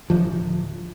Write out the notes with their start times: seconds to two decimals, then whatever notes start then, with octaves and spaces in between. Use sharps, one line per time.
0.10 D1 F3